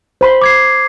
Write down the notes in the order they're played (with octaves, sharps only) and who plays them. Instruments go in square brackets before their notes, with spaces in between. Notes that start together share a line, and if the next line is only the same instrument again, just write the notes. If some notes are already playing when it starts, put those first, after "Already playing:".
[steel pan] C5 B5 C6
[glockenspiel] D6 G#6 C7